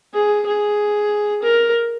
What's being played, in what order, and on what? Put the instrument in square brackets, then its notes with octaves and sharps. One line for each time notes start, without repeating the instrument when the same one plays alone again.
[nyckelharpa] G#4
G#4
A#4